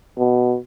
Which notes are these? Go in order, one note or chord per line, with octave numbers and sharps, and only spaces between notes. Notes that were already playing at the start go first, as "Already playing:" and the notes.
B2